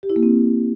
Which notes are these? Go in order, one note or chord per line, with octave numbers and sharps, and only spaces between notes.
G4
E4
A#3
C4